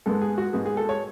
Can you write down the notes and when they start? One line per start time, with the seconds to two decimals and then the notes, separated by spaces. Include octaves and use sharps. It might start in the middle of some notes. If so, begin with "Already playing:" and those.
0.06 G#2 G#3 B3 A4
0.22 G#4
0.38 F#4
0.53 G#2 G#3 B3 G#4
0.66 G#4
0.77 A4
0.89 C#5